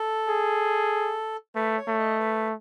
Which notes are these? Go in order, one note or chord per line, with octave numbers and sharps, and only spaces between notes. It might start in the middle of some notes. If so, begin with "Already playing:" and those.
Already playing: A4
G#4
A3 B4
C#5
A3
D#5
B4